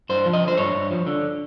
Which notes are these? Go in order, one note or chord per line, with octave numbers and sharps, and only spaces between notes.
G2 C5
F3
D#5
D3
C5
G2 C#5
G2
F3
D3